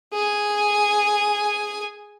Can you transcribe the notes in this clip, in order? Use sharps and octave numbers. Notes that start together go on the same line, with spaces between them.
G#4 G#5